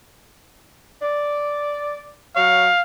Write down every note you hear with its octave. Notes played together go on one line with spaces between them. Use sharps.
D5
F#3 C#5 F5 F#5